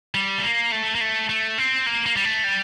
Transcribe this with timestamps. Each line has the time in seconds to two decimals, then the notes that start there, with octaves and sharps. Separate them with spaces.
0.15 G3
0.38 A3
0.44 A#3
0.72 A3
0.95 A#3
1.01 A3
1.29 A3
1.58 C4
1.86 A#3
2.06 A#3
2.16 G3
2.25 A3
2.44 G3